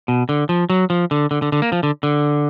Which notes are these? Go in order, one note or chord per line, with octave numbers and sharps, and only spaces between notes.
B2
D3
F3
F#3
F3
D3
D3
D3
D3
A#3
F3
D3
D3